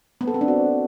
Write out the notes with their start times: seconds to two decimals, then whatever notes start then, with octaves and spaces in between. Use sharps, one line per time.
0.21 B3
0.28 A4
0.34 C4
0.41 D4
0.48 F#4